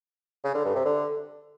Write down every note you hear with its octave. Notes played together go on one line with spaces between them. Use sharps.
C#3
D3
G2
C3
D3